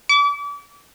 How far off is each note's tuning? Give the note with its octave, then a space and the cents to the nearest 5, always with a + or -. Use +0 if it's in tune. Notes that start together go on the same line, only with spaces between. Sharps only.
D6 -35